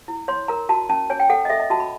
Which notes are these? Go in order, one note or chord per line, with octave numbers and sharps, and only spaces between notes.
E4
C#5 C6
A#4 A#5
F#4 A5
C#4 A5
C#5 G#5
G5
A4 F#5
D#5
A4 E5
D#5
F#4 A5
B5